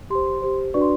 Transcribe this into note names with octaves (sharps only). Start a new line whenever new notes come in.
G4 C5 C6
G4 C5
D4 F#4 B4 D5 C#6
C6